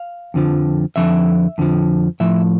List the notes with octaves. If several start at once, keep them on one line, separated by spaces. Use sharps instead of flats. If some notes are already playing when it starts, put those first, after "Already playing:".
Already playing: F5
F2 D3 F3
F2 D3 F3 E5
F2 D3 F3
A2 F3 E5